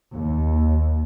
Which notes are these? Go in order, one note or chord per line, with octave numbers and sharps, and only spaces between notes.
D#2